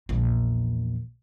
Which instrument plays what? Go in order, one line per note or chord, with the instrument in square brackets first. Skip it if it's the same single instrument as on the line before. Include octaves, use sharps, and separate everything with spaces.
[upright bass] A#1 E2